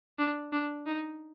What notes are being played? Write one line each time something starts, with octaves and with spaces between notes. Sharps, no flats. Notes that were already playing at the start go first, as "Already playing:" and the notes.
D4
D4
D#4